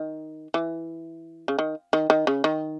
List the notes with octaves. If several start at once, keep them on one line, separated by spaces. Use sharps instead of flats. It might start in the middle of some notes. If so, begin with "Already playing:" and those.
Already playing: D#3
E3
C#3
D#3
D#3
D#3
C#3
D#3